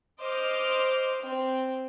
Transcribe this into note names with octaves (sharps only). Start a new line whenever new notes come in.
C5 D#5 D6 F6
C4